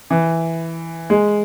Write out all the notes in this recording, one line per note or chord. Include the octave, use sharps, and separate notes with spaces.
E3
G#3